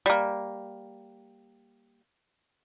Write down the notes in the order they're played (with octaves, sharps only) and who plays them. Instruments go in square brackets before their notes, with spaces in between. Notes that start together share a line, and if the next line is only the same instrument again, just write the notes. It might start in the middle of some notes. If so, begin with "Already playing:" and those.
[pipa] G3 A#3